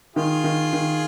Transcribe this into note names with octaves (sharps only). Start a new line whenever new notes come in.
D#3 F4 G#4
D#3
D#3